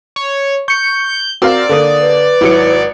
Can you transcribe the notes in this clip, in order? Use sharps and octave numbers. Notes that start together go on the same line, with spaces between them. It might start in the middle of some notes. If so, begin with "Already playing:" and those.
C#5
C#6 G6 C#7
C4 F#4 A#4 D5 F5
D3 A#3 A4 D#6
B4
G#1 F#3 E4 C#7